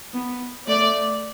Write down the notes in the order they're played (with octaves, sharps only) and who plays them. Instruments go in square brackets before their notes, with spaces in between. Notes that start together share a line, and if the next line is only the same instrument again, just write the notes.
[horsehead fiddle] B3
[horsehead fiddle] A3 [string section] D5